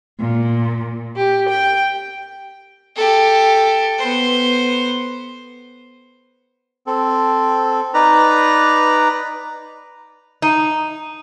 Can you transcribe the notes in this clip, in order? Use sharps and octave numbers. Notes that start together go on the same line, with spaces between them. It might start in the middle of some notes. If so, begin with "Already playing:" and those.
A#2
G4
G5
G4 A4
B3 C5
C4 A4
D#4 B4 D5 A#5
D#4